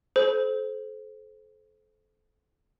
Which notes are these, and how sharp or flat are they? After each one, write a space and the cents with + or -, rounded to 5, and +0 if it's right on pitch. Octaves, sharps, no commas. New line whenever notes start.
A4 -35 C5 -5